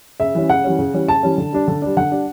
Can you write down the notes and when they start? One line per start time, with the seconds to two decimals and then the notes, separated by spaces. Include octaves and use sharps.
0.20 C#3 E5
0.35 E3 G3 C#4
0.49 C#3 F#5
0.64 E3 G3 C#4
0.79 C#3
0.94 E3 G3 C#4
1.08 C#3 A5
1.23 E3 G3 C#4
1.38 D3
1.53 G3 D4
1.68 D3
1.82 G3 D4
1.97 D3 F#5
2.11 G3 D4